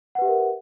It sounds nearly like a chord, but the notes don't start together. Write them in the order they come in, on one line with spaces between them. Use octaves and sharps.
F#5 B4 G4 E5 A#4